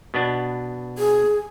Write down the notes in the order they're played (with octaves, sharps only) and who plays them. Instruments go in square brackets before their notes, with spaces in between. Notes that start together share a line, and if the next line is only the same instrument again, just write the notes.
[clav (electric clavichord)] B2 B3 D4
[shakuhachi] G#4